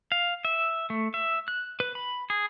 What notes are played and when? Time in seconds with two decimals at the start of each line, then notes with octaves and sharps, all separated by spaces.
0.12 F5
0.45 E5
0.90 A3
1.14 E5
1.48 F#6
1.80 B4
1.95 B5
2.30 G#4